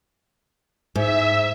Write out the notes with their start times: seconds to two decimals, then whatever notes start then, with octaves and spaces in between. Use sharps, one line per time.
0.96 G#2 E5